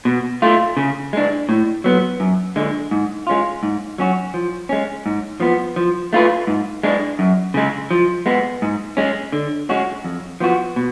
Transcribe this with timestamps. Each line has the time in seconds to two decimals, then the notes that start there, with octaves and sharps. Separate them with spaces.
0.05 B2
0.42 A3 F4
0.77 C#3
1.13 G#3 D4
1.49 A2
1.84 F#3 B3
2.20 F#2
2.56 D3 G#3
2.91 G#2
3.27 G#3 C#4 F4
3.63 G#2
3.98 F#3 C#4 F#4
4.34 F3
4.69 G#3 C#4
5.06 G#2
5.40 F3 B3
5.76 F3
6.13 A3 F4 B4
6.47 G#2
6.83 G#3 D4
7.19 F#2
7.54 C#3 G#3
7.91 F3
8.26 G#3 B3
8.62 G#2
8.97 G#3 C#4
9.32 D3
9.69 G#3 C#4 F#4
10.04 F2
10.40 F3 B3 F#4
10.76 B2